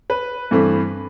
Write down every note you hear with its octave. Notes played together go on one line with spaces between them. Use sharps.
B4
G2 E3 A3 C4